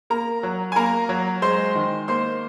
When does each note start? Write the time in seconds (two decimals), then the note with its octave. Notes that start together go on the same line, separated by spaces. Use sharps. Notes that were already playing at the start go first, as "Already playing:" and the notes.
0.10 A#3 A#4 A#5
0.43 F#3
0.72 G#5
0.76 A#3 A#4 A#5
1.09 F#3
1.42 G#3 C5 C6
1.75 D#3
2.08 A#3 C5 C6